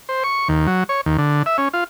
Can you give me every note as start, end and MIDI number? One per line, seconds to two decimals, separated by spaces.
0.09 0.23 72
0.24 0.48 85
0.49 0.67 39
0.67 0.84 54
0.89 1.01 73
1.06 1.17 39
1.18 1.43 50
1.46 1.57 76
1.58 1.68 61
1.73 1.84 65